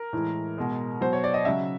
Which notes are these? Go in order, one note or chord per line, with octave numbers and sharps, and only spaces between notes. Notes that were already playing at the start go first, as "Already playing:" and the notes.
Already playing: A#4
A2 E3 G#3
B2 G#3
B2 F#3 C5
C#5
D5
D#5
C#3 F#3 E5